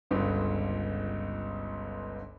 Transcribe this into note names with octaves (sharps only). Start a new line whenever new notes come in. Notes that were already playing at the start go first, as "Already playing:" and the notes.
G1 C#2 G2